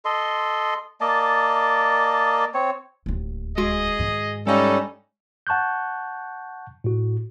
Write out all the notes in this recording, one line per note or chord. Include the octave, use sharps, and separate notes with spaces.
A4 D#5 C6
A#3 D5 D#5 A5
C4 C#5
D1 D#2
G#3 F#4 G#4 D#5 C6
G#2 D#3
G3 G#3 C#4 D#4 A4 F5
F#5 A5 C#6 F#6 G6
A2 F#4